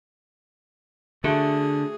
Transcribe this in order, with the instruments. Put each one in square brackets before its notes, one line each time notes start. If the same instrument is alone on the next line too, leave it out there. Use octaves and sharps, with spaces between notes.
[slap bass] D3 [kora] A3 F#4 [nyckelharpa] G#4